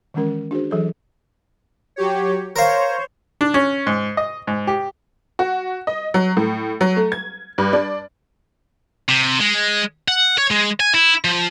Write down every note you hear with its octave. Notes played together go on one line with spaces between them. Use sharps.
D#3 E3 G#3 C#4 A#4
D4 F#4 G#4 C5
E3 F#3 G#4 A4 C#5
F#3 G4 C#5
A#4 C5 C#5 F5
D4
C#4
G#2
D#5
G#2
G4
F#4
D#5
F#3
A2
F#3
A3
G#6
G2
D4
C3
G#3
F#5
C#5
G#3
G#5
E4
F3